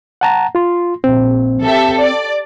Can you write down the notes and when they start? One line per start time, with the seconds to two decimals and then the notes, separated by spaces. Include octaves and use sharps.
0.21 F#5 A5 A#5
0.55 F4 C6
1.04 A#1 C4
1.62 G4 A4 E5
2.01 D5